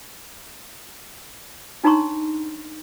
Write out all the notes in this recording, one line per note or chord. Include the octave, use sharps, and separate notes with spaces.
D4 D#4 C#5 A#5 C6 C#6